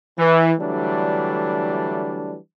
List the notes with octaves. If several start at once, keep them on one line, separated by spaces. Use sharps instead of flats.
E3
D3 E3 F#3 G3 A3 D4